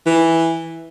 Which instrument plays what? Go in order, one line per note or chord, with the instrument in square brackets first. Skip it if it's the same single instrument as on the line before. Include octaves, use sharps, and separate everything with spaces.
[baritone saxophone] E3